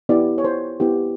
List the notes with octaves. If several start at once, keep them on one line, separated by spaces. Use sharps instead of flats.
B3 E4 G4 D5
C#5
C5
B3 E4 G4